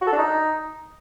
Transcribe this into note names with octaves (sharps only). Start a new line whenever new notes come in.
F#4
A4
D4
D#4